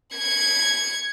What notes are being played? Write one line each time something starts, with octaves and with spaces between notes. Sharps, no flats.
G#6 C#7